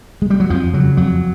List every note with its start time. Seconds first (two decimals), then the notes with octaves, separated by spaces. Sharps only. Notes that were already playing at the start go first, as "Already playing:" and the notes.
0.22 G#3
0.30 G3
0.40 F#3
0.50 F2 F3
0.73 C#3 F#3
0.97 F2 F#3